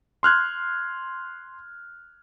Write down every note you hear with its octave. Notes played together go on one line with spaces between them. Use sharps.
C6 F6 F#6 G#6